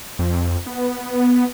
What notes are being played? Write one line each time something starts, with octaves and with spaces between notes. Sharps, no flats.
F2
B3